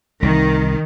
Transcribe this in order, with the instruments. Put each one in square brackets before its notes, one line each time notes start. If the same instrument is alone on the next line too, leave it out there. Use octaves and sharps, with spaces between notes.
[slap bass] C2 [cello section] D#3